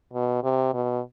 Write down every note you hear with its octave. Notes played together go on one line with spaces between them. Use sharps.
B2
C3
B2